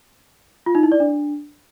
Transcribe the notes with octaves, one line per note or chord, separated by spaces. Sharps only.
F4
D#4
E4
D5
D4